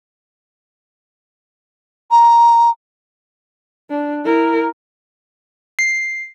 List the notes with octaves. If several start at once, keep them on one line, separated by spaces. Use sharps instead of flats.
A#5
D4
E4 A#4
C7